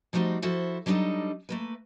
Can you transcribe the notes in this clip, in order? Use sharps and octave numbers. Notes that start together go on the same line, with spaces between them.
F3 G3 A3 D#4 F#4 C5
F3 E4 F#4 A4 C5
F#3 G3 D4 D#4 A4 D#5
A3 A#3 B4